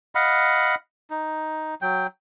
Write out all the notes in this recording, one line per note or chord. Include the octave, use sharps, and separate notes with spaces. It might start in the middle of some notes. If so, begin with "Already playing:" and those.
D#5 F5 F#5 B5
D#4
F#3 G5